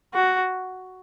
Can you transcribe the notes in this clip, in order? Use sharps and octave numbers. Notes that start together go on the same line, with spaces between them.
F#4